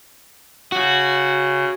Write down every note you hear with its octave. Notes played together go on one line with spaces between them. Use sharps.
C#3 F#4